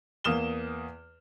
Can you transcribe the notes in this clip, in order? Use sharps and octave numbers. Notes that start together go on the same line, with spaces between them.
E2 A#3 D#6 F6 E7 G7